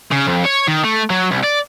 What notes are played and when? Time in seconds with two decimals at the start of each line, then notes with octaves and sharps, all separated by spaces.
0.12 C#3
0.27 F2
0.46 C#5
0.68 D#3
0.84 A3
1.10 F#3
1.31 C2
1.43 D5